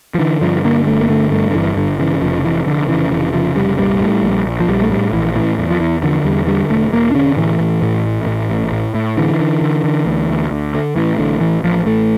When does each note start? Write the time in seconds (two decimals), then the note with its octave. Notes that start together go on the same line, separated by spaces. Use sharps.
0.15 F3
0.19 D3 E3
0.41 G2 F3
0.64 D3 A#3
0.87 G1 A3
1.00 A#3
1.09 D3 A3
1.31 G2 A3
1.50 D3
1.54 G1 E3
1.76 G1 D3
1.99 C#3 E3
2.22 F1 F3
2.43 F2 E3
2.67 F1 D3
2.88 C#3 E3
3.10 F1 E3
3.33 C#3 F3
3.56 F1 G3
3.78 A#1 G3
4.01 A2
4.23 A#1
4.46 A#1
4.60 F3
4.68 A#1 G3
4.81 A3
4.90 A2 G3
5.13 A#1 E3
5.35 A2 E3
5.58 E2
5.71 F3
5.80 E2 E3
6.03 D3 F3
6.24 E2 G3
6.47 D3 G3
6.70 E1 A3
6.93 E1 A#3
7.11 D4
7.15 D3 C#4
7.37 A2 E3
7.60 A2
7.82 A2
8.05 A1
8.26 A2
8.50 A1
8.72 A2
8.94 A2
9.17 D3 E3
9.40 D3
9.62 D3
9.84 D3
10.06 D2
10.30 D2
10.51 D2
10.74 D3
10.96 A2 E3
11.18 A1 D3
11.41 A1 E3
11.63 A1 F3
11.86 A1 A3